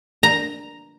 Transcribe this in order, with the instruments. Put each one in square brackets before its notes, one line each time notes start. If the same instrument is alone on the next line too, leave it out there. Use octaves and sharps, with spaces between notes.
[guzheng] A#5